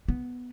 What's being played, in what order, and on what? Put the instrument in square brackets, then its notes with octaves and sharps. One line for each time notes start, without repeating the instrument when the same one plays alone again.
[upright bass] B3